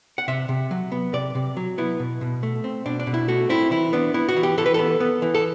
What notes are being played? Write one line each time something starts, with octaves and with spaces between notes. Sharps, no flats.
F#5
C3 E5
C3
F#3
B3
C3 D5
C3
F#3
B3 E4
B2
B2
A3
C4
B2 D4
D4
B2
E4
A3 F#4
C4 E4
E3 E4
B3 D4
B3 E4
F#4
E3
G4
E3 A4
B4
B3 A4
B3
E3
A4